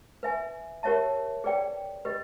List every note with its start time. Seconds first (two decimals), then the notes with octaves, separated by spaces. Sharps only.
0.23 B4 E5 G#5
0.83 G4 A#4 C#5 E5 A5
1.44 G#4 B4 D5 G5
2.05 G4 B4 D#5